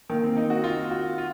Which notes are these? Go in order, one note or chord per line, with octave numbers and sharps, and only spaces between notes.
D#3 A#3
C4
D#4
F#4
F4
F#4
F4